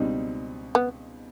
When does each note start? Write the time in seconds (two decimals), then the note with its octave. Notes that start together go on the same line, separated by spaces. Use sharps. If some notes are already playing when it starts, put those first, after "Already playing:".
Already playing: C#2 B2 G3 C4 D#4
0.75 B3